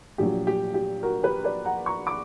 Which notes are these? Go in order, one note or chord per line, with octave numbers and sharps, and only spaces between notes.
A#1 A#2 F#3 G4
G4
G4
F#4 A#4
G4 B4
B4 D5
F#5 A#5
A#5 C#6
B5 D6